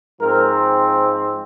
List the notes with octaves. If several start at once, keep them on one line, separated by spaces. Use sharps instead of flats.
G#2 F3 C4 A#4